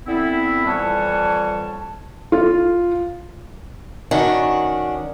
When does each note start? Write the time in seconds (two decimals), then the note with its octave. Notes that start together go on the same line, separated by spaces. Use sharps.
0.06 D3 B3 C4 E4
0.65 F2 E3 G3 C#5 F#5 A5
2.32 F4
4.11 D#3 C#4 D4 F#4